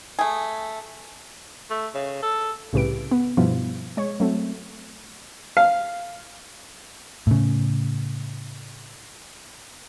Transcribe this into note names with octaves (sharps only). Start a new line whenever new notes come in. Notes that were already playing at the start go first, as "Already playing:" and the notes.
A3 G#4
A3
C#3
A4
C2 A2 C#3 G4 B4 D7
B3
G2 B2 F3 G3 B3 E4
G#3 C#5
F#3 A3 C4
F5
A2 C#3